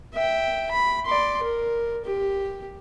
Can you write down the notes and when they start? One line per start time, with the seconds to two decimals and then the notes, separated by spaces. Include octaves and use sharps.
0.13 E5 G5
0.71 B5
1.06 D5 C6
1.43 A#4
2.05 G4